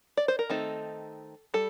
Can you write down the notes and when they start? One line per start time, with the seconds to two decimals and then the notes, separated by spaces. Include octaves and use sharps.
0.17 D5
0.28 C5
0.39 A#4
0.50 D#3 A3 C4 D#4 A4
1.54 G3 A4